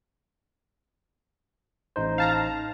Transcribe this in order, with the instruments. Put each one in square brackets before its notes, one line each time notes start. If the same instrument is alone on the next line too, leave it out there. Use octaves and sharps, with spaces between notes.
[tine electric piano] A1 D#4 C5
[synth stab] F5 A5 A#5